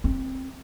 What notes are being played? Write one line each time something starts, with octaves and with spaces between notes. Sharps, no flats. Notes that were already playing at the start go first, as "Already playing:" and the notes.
C4